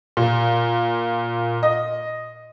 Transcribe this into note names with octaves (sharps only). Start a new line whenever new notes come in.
A#2
D#5